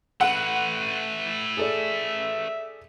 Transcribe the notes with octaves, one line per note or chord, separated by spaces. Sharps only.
A3 B4 F#5
G#4 A4 D5 E5